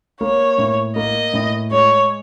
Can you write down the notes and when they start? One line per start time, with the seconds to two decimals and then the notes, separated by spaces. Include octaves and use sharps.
0.21 A#3 C#5
0.58 A2
0.96 A#3 D#5
1.34 A2
1.71 G#3 C#5